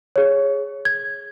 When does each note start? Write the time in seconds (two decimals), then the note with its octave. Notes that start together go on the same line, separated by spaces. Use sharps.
0.16 G#4 C#5
0.85 G#6